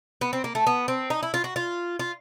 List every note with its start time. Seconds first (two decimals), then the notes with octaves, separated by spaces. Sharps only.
0.21 B3
0.33 C4
0.44 A#3
0.55 A3
0.67 B3
0.88 C4
1.10 D#4
1.23 E4
1.34 F4
1.44 F#4
1.56 F4
1.99 F4